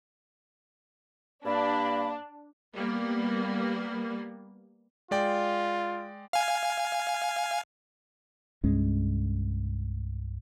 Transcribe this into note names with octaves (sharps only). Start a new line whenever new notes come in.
G2 A#3 D4 B5
G3 A#3 B3
G#3 F4 D5 G5
F5 G#5
C2 G2 G#3 C#4